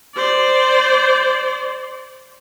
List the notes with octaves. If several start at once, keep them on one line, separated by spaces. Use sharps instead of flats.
C5 D5